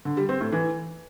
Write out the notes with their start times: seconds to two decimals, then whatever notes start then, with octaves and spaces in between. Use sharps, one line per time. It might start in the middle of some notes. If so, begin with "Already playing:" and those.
0.05 D3
0.17 G3
0.29 C4
0.41 A2
0.52 E3